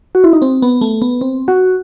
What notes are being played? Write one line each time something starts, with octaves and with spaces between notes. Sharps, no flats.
F#4
E4
D#4
C4
B3
A3
B3
C4
F#4